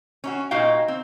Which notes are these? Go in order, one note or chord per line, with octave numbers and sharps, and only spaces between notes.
C#4 D#4 F#4
A#2 D#4 F#4 D#5 F5 G5
C4